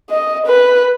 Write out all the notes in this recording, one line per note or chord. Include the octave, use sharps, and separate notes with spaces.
D#5
B4